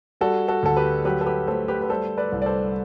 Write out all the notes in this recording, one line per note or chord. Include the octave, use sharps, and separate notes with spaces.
G3 F#4 A4
F#4 A4
D2 A4
G4 B4
F#3 G4 B4
A4
G4 B4
A3 A4 C5
G4 B4
B4
G3 A4 C5
B4 D5
C2
D5
A4 C5